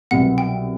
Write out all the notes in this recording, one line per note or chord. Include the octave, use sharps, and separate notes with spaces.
C2 B2 F#3 F#5
G5